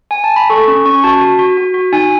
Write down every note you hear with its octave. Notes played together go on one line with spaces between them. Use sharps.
G#5
A5
B5
A4 C#6
C#4 C#6
C#4 C#6
F#4 A5
F#4
F#4
F#4
F#4
D#4 G#5